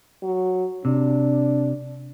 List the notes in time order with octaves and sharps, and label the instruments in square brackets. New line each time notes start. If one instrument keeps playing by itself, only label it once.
[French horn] F#3
[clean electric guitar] C3 [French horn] D4